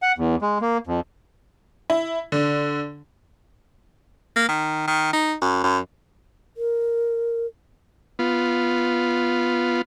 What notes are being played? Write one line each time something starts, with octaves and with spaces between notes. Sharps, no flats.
F#5
E2
G#3
A#3
F2
E4
D3
A#3
D#3
D#3
D#4
F#2
F#2
A#4
B3 F4